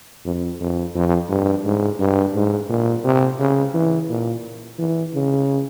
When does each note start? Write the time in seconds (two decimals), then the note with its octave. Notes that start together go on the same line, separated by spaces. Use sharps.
0.25 F2
0.60 F2
0.95 F2
1.29 G2
1.65 G#2
1.99 G2
2.35 G#2
2.69 A#2
3.04 C3
3.39 C#3
3.74 E3
4.09 A#2
4.79 E3
5.14 C#3